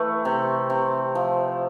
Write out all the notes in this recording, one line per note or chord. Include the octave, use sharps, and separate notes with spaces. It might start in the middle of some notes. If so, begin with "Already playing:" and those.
Already playing: E3 A3
C3
C3
F3